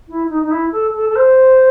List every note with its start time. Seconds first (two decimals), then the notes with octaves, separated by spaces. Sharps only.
0.08 E4
0.29 D#4
0.43 D#4
0.51 E4
0.72 A4
0.94 A4
1.09 A4
1.16 C5